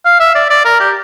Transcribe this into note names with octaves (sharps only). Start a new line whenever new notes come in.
F5
E5
D5
D5
A#4
G4